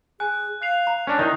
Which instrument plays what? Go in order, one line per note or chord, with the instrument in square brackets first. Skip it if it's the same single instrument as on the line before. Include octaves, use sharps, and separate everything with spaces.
[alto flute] G#4 [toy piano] G#5 [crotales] F#6
[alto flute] F5 [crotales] F#6 C7 F7
[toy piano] A#5
[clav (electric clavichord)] C#4 D4
[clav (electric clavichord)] D#3 D#4 [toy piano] E4 D5 [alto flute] E5